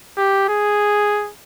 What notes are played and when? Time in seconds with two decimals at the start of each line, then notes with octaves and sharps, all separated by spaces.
0.18 G4
0.48 G#4